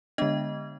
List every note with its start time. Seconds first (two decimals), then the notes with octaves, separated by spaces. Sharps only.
0.18 D3 G#3 B3 D4 D#5